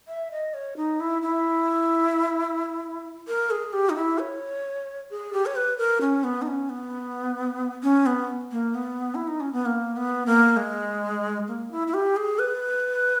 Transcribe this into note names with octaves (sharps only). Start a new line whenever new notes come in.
E5
D#5
C#5
D#4
E4
E4
A#4
G#4
G4
D#4
E4
C#5
G#4
G4
C#5
B4
A#4
C#4
B3
D#4
C#4
B3
C#4
B3
A#3
B3
E4
D#4
C#4
B3
A#3
B3
A#3
G#3
A#3
E4
E4
G4
G#4
B4